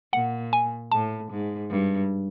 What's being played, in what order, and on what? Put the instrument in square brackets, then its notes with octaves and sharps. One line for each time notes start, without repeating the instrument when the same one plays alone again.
[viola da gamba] A#2 [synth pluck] F#5
[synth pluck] G#5
[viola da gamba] A2 [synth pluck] A5
[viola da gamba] G#2
G2